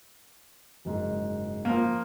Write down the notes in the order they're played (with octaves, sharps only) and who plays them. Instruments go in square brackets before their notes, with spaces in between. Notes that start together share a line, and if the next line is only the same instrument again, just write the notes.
[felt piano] F#1 G#2
[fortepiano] F3 A#3